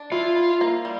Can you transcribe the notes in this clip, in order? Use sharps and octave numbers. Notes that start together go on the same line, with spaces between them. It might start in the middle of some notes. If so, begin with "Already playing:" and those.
Already playing: D4
E4 F4
E4
A#3
G3